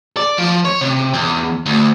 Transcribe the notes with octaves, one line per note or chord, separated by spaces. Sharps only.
D5
F3
C#5
C3
E2
D2